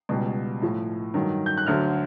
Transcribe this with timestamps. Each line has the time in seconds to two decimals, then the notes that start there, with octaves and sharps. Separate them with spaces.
0.09 C#2 B2 G3
0.62 A2 F3
1.14 G2 D#3 F#3
1.46 G6
1.58 F#6
1.66 D2 D3 F#3 F6